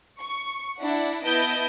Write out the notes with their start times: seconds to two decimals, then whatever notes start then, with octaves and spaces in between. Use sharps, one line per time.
0.22 C#6
0.79 D4 E4 F#5
1.24 B3 E4 D#5 A5 G6 D7